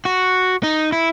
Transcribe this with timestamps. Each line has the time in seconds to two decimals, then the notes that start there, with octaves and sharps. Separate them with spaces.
0.05 F#4
0.63 D#4
0.92 E4